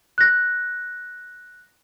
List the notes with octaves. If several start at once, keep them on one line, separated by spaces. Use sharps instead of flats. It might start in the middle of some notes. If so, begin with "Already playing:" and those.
F#6 A#6